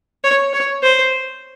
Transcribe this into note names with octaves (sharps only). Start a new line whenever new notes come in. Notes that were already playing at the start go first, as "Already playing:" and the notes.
C#5
C#5
C5